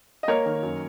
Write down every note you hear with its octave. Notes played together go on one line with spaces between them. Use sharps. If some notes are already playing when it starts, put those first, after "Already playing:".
D#5
A#3 A#4 C#5
D#3
F#2